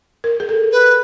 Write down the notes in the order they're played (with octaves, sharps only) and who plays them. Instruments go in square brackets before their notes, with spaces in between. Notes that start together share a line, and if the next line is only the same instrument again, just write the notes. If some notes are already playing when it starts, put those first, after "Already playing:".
[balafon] A#4
G#4
A4
[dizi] B4